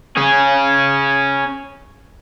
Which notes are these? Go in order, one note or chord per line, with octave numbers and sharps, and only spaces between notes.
C#4 G#4